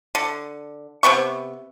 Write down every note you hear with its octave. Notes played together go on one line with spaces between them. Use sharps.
D3
C3 D#3 B3 C#6